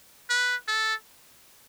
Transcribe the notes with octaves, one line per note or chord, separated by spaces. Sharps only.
B4
A4